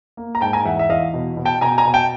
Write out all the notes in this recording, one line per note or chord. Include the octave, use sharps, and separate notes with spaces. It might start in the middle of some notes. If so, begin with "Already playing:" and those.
A#3
A#5
G#2 G5 A5
G#5 A#5
E2 E5 F#5
E5
E2 D#5 F5
B2
B2
G5 A5
B2 G#5 A#5
G#5 A#5
B2
G5 A5